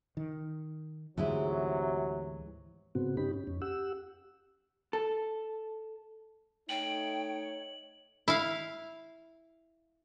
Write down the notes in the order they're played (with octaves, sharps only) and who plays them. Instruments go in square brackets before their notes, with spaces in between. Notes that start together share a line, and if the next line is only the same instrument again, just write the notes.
[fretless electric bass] D#3
[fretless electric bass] D2 G#2 [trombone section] C3 F#3 [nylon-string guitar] E3 G#3 E4
[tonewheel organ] G#2 C#3 B3 C4 F#4
G2 C#4 D#4 G4 B5
C#4
F2 C#4
G4 F#5 E6
[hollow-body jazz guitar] A4
[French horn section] A3 D#4 [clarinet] C#5 [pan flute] G5 [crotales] F#7
[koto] E4 F5